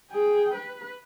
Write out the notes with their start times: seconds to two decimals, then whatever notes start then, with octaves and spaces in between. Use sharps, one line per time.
0.12 G#4 G5
0.54 B4